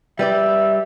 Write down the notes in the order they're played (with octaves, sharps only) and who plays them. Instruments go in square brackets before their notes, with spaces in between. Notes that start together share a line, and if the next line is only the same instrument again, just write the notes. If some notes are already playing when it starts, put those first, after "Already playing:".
[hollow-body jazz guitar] G3 B4 D5 [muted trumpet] E5